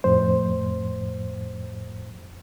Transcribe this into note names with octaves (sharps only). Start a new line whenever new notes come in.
F2 A2 C5